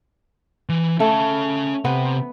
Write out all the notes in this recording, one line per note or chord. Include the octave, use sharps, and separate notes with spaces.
E3
A3 C#4 F5
C3 B3